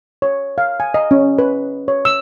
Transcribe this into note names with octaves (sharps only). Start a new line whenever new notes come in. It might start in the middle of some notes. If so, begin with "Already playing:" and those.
C#5
F5
G#5
D#5
C#4
B4
C#5
E6